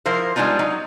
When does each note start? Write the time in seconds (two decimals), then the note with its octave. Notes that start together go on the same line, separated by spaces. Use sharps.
0.06 F3 E4 A#4 C5
0.36 G3 G#3 B3 D4 D#4 F4
0.59 F#3 D#4